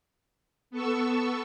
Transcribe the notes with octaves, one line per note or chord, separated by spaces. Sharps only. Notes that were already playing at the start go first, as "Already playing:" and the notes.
B3 A4 C#6 E6